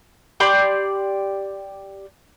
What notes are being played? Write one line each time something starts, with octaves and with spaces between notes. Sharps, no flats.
G4 D5 B5 C6